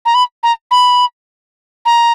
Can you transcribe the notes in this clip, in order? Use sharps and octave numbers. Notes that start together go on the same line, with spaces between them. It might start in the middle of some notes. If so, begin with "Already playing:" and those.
A#5
B5
A#5
B5
A#5